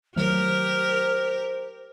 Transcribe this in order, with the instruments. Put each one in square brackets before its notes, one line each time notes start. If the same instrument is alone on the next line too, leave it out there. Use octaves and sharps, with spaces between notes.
[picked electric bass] D#3 F#3 A3 [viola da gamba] G4 A#4 [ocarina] C5 [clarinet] F6